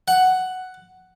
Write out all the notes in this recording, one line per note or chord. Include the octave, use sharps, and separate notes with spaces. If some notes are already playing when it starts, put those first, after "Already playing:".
F#5